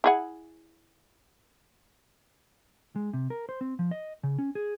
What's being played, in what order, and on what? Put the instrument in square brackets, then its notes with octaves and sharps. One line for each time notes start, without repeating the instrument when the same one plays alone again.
[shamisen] E4 G#4 F#5
[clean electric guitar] G#3
C3
A#4
C5
C4
F3
D#5
C#3
C#4
G#4